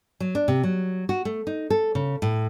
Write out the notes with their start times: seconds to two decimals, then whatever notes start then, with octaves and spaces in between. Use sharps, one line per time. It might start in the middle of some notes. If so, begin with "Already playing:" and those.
0.20 F#3
0.35 D4
0.48 C3
0.63 F#3
1.09 F#4
1.25 A3
1.47 D#4
1.70 A4
1.95 C#3
2.22 A2